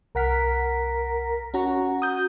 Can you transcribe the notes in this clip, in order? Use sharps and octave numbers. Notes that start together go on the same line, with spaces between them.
C2 A#4 F#5 B6
C#4 F#4 A#5
D#6 G6